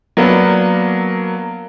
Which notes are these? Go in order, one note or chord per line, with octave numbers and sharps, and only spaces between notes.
F#3 A#3 B3 D4